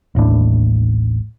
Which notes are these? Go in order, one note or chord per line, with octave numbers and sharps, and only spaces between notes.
A1 D#2 A2 D4